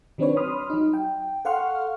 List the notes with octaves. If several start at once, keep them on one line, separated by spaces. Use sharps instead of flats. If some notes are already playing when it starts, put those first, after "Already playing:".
D#3 F#3 C4 D4 B4 C#5
B5 C6 D#6 F6
F#3 D#4
G5
A4 F5 F#5 C6 C#6 F6